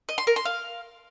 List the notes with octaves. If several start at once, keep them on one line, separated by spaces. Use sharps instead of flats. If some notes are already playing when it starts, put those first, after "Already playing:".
D#5
C6
A#4
C6
F5